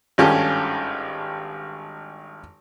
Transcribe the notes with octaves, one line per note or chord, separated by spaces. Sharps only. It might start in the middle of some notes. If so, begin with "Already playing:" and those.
G#1 G2 C#4 F4 G4 A4